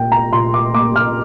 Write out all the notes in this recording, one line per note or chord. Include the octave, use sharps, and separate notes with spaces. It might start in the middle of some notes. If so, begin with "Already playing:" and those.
Already playing: A#2 A#3 G5
A#5
A#2 C6
D6
A#3 D6
F6